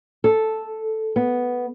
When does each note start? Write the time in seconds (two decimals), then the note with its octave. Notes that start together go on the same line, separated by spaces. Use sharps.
0.24 A4
1.16 B3